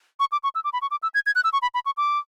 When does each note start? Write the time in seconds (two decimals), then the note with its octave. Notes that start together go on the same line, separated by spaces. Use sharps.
0.20 C#6
0.32 D6
0.44 C#6
0.55 E6
0.64 D6
0.73 B5
0.82 C#6
0.91 D6
1.03 E6
1.14 G#6
1.26 G#6
1.35 F#6
1.44 E6
1.53 C#6
1.62 B5
1.74 B5
1.86 C#6
1.97 D6